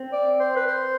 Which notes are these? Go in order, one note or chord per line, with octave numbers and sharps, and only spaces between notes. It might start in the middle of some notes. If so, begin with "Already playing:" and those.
Already playing: C4
D5
C5
B4
C5